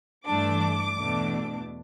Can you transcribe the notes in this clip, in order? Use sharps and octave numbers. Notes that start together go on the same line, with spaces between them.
G2 E3 A3 D4 D6
E2 B2 A3 D4